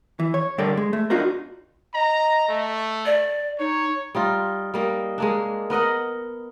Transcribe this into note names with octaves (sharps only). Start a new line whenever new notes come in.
E3
C#5
G2 D3 A4 A#4 D5
G#3
A3
D4 D#4 F4 F#4 A#4
D#5 A#5
A3
D5
D#4 C#5
G3 D#4 F4
G3 A#3 D#4
G#3 A#3 D4
B3 A#4 D#5 F#5